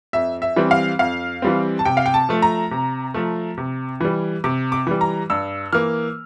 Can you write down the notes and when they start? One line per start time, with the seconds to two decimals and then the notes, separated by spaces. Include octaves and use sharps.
0.13 F2 E5
0.42 E5
0.56 E3 G3 C4
0.71 F5
0.99 F2 F5
1.42 E3 G3 C4
1.79 A5
1.85 C3 G5
1.97 F5
2.06 G5
2.14 A5
2.29 F3 A3
2.42 A#5
2.71 C3
3.14 F3 A3
3.58 C3
4.01 E3 G3
4.44 C3 D6
4.72 D6
4.87 E3 G3
5.01 A#5
5.30 G2 E6
5.73 E3 A#3 F6